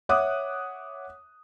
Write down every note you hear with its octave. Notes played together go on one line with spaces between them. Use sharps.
C#5 E5 F#5 D6 D#6 F#6